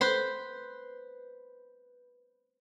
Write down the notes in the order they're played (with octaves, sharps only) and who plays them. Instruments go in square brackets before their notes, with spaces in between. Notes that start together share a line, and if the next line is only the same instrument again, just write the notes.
[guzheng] B4 C5 C6